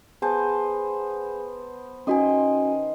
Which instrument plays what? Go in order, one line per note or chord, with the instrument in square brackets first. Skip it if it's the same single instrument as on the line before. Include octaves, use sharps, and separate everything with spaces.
[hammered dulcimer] B3 C5 A5 [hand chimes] G#4 G#5
[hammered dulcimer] D#3 D#5 C6 [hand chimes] C#4 F#4 G#5